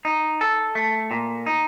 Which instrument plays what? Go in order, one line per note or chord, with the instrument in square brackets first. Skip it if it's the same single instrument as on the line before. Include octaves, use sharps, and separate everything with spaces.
[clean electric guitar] D#4
A4
A3
A#2
D#4